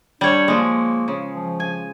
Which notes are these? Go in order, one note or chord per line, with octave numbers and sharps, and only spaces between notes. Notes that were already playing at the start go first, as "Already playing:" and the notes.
G3 D4 C#5
F3 G#3 A#3
C#3
F3
G#5